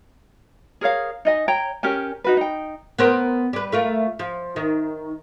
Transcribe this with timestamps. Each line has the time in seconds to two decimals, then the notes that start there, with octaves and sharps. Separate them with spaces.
0.81 G#4 A#4 C#5 F5
1.25 D#4 D#5 G#5
1.48 C#5 G5 A#5
1.83 C#4 G4 A#4 G#5
2.24 D#4 F#4 B4
2.37 D#4 G5
2.99 B3 A#4 C5
3.53 G3 B4
3.72 A3 F4 A#4
4.19 F3
4.56 D#3